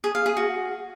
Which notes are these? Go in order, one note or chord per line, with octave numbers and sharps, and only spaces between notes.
G#4
F5
G#4
F#4